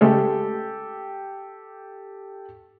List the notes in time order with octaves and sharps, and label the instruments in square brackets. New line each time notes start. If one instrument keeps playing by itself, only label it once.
[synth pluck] C#3 G#3 A3 [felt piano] G4 A4